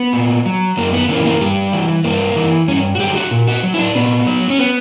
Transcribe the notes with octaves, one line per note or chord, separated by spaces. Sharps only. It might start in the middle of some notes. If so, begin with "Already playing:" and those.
Already playing: B3
A#2
F#3
F#2 A#3
B3
C#3 E3 A#3
A#3
G2 G3
E3
G2 A#3
E3
G2 C#4
F#4
D3 F#3 G4
F#4
A#2
F#4
F#3
E4
D4
A#2 B3
F#3
C#4
B3